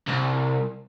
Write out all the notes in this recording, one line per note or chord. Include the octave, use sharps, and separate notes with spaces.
C2